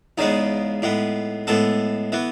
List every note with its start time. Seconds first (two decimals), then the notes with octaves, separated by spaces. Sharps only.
0.18 E2 C#3 G#3 B3 D#4
0.82 A2 G#3 B3
1.47 A2 G#3 B3 A4
2.12 E3 B3